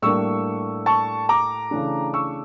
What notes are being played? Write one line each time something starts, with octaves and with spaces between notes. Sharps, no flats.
A2 G3 A#3 D4 C#6 E6
A5 C#6
A#5 D6
C#3 E3 A3 D4
C#6 E6